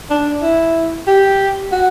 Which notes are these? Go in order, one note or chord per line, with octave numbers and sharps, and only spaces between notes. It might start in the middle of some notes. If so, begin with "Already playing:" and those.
D4
E4
G4
F#4